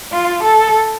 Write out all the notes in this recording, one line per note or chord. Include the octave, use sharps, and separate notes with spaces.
F4
A4